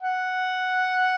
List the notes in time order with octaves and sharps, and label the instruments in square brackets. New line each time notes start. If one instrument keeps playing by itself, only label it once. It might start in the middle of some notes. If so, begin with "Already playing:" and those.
[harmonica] F#5